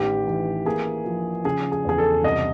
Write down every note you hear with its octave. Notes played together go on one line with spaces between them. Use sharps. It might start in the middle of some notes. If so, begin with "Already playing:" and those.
Already playing: A1 D#3 G4
E3
A#3 G#4
F3
C#3 G#4
G#4
E2 G#4
A4
C2 D#5